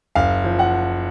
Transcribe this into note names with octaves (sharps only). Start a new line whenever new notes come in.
F#1 F5
F3
F#5